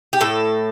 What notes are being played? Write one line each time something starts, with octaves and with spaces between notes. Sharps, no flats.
G4
A2 A4